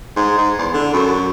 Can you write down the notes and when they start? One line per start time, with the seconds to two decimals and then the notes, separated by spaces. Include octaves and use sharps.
0.16 G#2
0.38 G#2
0.59 E2
0.74 D3
0.94 F#2